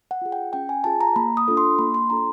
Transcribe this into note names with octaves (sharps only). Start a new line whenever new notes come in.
F#5
F4 G#4
G5
C#4 G5
G#5
F4 G#4 A5
A#5
A#3 B5
D#6
D4 F4 A4
C6
A#3 B5
C6
D4 F4 A4 A#5